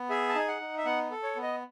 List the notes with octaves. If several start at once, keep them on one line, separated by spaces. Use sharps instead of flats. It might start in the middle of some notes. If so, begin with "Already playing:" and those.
Already playing: B3
G#4 E5
A5
D#4 G#5
F#5
D#4
E5
B3 F#5
A4
C#5
B3
D#5